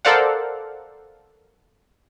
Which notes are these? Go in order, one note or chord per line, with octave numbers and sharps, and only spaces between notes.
A4 A#4 C5 D5 F5 F#5